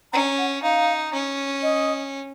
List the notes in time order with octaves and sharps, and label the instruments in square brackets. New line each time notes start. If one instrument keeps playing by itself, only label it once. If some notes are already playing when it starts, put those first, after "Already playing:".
[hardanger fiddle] C#4 [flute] A#5
[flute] F#5
[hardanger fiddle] D#4 [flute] F5
[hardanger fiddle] C#4
[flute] D#5